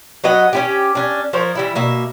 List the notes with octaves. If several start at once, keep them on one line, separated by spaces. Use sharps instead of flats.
F#3 B3 D#5 F#5
C#4 E4 G4
C#4 D4
F3 A#4 C5 C#5
E3 G3 E4
B2 A#3 E5